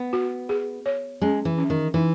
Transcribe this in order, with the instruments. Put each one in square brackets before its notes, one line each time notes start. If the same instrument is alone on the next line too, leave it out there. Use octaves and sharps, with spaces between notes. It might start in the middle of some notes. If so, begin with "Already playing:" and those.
Already playing: [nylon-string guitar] B3
[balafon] F#4
G#4
C#5
[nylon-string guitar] G#3 [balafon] C#4
[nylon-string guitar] E3
[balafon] C#4
[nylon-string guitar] D#3
[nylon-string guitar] E3 [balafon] D#4